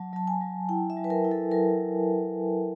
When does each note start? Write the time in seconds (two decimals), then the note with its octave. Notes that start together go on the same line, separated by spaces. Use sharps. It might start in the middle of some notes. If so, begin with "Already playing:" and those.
Already playing: F#3 A5
0.13 F#3 A5
0.28 G#5
0.41 F#3
0.69 E4 G5
0.90 E5
0.97 F#3
1.04 B4
1.10 A#4
1.25 E4
1.31 A4
1.51 F#3 A#4